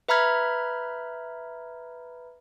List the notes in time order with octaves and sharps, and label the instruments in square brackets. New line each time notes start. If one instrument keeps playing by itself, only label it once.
[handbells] B4 E5 A#5 B5 F6 G#6